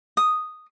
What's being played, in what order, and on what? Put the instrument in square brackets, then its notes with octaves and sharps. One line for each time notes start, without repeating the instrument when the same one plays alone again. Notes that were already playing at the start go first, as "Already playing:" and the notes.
[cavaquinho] D#6